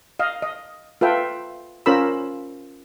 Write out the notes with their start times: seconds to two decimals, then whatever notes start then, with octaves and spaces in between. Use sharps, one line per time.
0.19 D#5 F5
0.42 D#5
1.01 F4 A4 B4 E5 G5
1.86 C#4 F4 A#4 C5 B5 E6